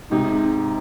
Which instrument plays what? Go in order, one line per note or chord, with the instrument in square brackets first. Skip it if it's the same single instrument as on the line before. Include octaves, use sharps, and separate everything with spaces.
[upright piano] G#2 C3 [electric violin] D#4